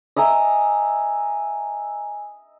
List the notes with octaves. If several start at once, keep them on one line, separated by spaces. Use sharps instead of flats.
D#5 E5 G#5 A#5